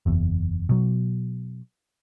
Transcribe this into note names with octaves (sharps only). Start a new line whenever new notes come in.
F#1 E2
B2 F#3